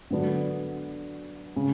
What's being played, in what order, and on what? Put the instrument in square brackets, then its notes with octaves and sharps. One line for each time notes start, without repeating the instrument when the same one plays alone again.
[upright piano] D3 F#3 B3 D4
C#3